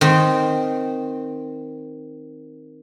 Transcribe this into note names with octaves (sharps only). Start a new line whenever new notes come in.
D#3 C4